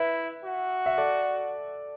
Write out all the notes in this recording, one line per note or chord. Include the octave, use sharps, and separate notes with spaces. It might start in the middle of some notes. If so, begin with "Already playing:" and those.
Already playing: E4 B4 E5
F#4
E5
A4 D5